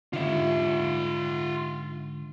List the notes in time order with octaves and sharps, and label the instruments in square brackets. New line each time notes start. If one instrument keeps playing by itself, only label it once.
[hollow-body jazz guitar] G#2 D3 [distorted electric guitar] F4 E5